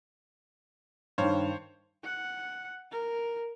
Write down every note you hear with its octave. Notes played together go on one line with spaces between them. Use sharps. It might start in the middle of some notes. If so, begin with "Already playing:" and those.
G2 D#3 C5 C#5 F5
F#5
A#4